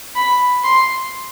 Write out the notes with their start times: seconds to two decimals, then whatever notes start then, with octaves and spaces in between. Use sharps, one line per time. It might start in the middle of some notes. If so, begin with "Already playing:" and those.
0.16 B5
0.64 C6